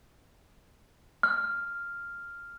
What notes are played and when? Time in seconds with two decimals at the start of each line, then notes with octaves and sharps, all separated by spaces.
1.23 F6